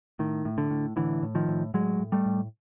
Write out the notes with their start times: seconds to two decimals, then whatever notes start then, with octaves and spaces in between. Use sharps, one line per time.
0.19 A2 D#3
0.45 A2
0.58 D3
0.70 A2
0.96 A2 D3 E3
1.22 A2
1.35 D#3 F3
1.48 A2
1.74 A2 F#3 G#3
2.00 A2
2.12 G3 A3
2.26 A2